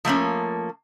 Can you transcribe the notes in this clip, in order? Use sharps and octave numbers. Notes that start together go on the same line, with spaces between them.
F3 A3 A#3 C#4